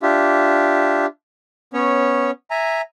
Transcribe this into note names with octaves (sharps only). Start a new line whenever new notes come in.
D4 F4 G4 E5
B3 C#4 C#5
E5 G#5 A#5